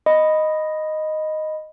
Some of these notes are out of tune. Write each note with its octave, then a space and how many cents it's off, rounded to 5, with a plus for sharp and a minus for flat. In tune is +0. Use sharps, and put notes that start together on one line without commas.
D#5 +0 B5 +0